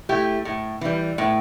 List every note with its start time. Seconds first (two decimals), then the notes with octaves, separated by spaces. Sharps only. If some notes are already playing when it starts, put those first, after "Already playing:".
0.09 A3 E4 G4
0.45 A2
0.81 E3 G3
1.18 A2